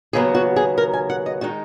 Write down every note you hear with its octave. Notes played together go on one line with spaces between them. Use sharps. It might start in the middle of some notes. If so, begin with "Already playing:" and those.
D#2 C#3 F#3 B3 G#4
F#4
G#4
A#4
G#5
F#5
D#5
D#3 G#3 D#4 F#4